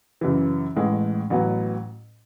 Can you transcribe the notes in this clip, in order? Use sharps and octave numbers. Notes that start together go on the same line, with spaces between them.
F#2 C#3 E3
A1 A2 E3 G#3
A1 A2 F#3 B3